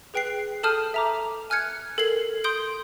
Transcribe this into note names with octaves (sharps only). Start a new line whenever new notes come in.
G#4 B4 G5 F#6 C7
A4 A5 D#6 F6 G6 D#7
E5 A#5 D6
G#5 F6 F#6 G#6 C#7
A4 A#4 G#6 C7 F#7
C6 D#6 G6 D7